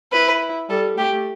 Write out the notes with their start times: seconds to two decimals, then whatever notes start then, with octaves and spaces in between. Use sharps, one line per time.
0.12 E4 B4
0.69 G3 A4
0.97 A3 G4